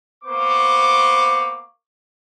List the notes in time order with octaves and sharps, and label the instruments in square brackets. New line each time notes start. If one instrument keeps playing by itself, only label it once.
[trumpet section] A#3 B3 C5 C#6 D6